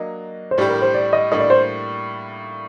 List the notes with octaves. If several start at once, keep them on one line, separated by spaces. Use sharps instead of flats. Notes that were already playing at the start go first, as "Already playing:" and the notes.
Already playing: F#3 A#3 D4 D#5
C5
A2 G3 D4 G4 D5
A#4
C5
D5
D#5
A2 G3 A#3 D4 D#5
D5
C5